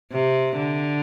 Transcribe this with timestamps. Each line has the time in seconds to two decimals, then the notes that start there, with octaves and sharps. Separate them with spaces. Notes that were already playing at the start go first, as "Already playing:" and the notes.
0.12 C3
0.57 D3